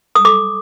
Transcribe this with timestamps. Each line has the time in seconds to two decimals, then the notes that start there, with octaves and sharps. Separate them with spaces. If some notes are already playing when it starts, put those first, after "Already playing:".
0.15 D#6
0.25 A4 D6